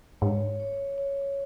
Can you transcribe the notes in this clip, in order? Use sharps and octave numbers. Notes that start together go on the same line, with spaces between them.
G#2 C#5
C#5
C#5